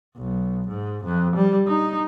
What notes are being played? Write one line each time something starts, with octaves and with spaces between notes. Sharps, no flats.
B1
G#2
F2
G3
D#4